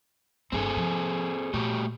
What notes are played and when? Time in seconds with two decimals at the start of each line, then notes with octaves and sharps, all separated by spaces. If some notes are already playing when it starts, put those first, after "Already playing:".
0.52 G1 A3 C4 G#4 A4
0.77 F3
1.53 A#2 A3 F#4 G4